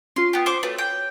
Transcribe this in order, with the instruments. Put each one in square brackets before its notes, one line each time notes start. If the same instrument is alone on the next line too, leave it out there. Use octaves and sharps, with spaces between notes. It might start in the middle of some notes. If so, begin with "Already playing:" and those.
[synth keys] C#4 F4 [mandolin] C6
[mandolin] B3 G4
C5 C#6 D6
[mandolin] A3 [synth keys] F#4 B4 C#5
[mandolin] G5